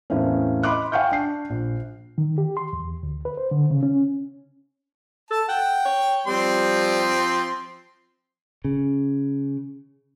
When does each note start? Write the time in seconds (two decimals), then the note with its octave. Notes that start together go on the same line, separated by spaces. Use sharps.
0.10 E2 A2 A3 A#3 C4 C#4
0.63 D#5 B5 C6 D6 F#6
0.92 F5 G5 G#5 C#6 F6 G6
1.12 D4 C7
1.50 A#1
2.18 D#3
2.38 G4
2.57 C6
2.73 E2
3.03 D2
3.25 B4
3.37 C5
3.51 D3
3.71 C#3
3.83 C#4
5.31 A4 A5
5.49 F#5 G5
5.85 C#5
6.27 F3 G3 C4 C6
8.64 C#3